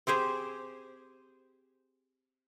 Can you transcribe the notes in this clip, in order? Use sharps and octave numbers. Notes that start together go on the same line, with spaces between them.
C4 G4 G#4 C5